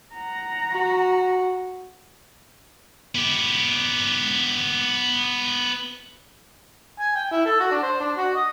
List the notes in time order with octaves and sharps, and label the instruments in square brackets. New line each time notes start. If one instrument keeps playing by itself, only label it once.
[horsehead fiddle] F#5 A#5
[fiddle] F#4
[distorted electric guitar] B3 G4
[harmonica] G#5
G5
E4
A4
F#4
D4
C5
D4
F#4
D#5